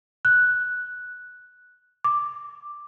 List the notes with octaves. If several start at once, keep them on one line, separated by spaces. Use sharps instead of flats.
F#6
D6